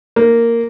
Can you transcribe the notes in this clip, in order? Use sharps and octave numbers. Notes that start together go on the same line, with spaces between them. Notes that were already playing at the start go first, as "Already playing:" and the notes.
A#3